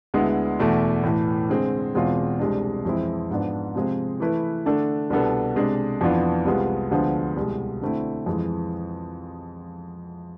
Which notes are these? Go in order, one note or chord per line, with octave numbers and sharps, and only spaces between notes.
D2 D3 G#3 B3 E4
E2 B2 A3 E4
A2 E3 A3
D3 G#3 C4 G#4
E2 B2 G#3 C4 F4
C2 C3 G#3 D4
F2 E3 G#3 C4 E4
G#2 F3 B3 D4
C3 F3 G#3 C4 G#4
E3 A3 E4 B4
D3 A3 D4 A4
C2 B2 B3 D4 A4
C3 G#3 D4
F2 E3 B3 D4 F4
C2 C3 G#3 B3 F4
D2 D3 F3 G#3 B3
C2 B2 G#3
D3 A3 C4 E4
F2 E3 G#3